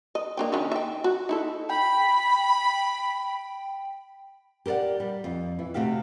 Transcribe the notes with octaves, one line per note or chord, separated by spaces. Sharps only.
D#5
A#3 D4 G5
D#3 C#4 F#4
E5 G5
F#4
D#4 E4 A4
G5 B5
G4 A#4 C5 D5 F#5
G3
F2
E3
C3 A3 F#4 G4 F5